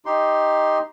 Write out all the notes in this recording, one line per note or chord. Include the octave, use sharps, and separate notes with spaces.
D#4 G4 C6